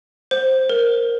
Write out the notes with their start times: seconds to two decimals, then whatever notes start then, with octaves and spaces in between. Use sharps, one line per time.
0.31 C5
0.69 A#4